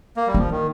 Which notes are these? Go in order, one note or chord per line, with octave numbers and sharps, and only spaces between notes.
A#3
G3
F3 A#3
D#3